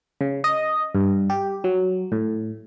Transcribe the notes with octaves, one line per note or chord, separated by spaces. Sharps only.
C#3
D#5
G2
G4
F#3
A2